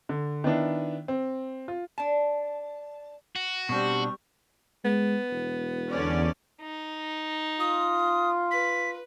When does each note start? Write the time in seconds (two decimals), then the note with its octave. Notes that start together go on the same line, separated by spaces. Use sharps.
0.09 D3
0.44 D#3 B3 D4 E4
1.08 C4
1.68 F4
1.98 D4 A5
3.36 F#4
3.69 B2 G3 C4 D4 C#6
4.85 G#3 B3
5.32 E1
5.92 E2 D3 C#4 D5
6.61 D#4
7.60 F4 D#6
8.51 B4 B6